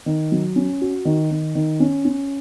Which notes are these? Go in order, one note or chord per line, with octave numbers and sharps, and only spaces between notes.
D#3
F#3
C#4
F#4
D#3
D#3
D#3
C#4
C#4